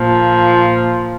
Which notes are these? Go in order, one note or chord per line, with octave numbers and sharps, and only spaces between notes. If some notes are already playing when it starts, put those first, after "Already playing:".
Already playing: A#2 F3